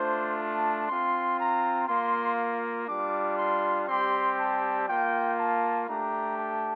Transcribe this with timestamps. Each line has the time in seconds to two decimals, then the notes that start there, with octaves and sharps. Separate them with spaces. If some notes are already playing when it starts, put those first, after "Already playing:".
Already playing: A3 D4 F4 C5
0.39 A5
0.88 C4 F4 C6
1.39 A#5
1.88 A#3 F4 C6
2.88 G3 D4 F4 D6
3.38 C6
3.88 G3 C4 G4 C6
4.37 A5
4.87 A#3 F4 G5
5.37 A5
5.87 A3 D4 G4 A#5
6.37 A5